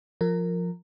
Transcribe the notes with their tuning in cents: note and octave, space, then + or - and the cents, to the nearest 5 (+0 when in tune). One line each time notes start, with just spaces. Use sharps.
F3 +5 A#4 -15